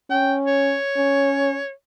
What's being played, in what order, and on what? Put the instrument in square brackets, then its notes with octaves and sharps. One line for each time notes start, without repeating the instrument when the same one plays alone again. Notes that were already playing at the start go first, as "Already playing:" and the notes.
[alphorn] C#4 [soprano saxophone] G5
[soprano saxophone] C#5
[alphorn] C#4